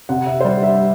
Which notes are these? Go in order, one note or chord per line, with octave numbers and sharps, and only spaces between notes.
C3 F#5
E5
C5
G3 D5
E5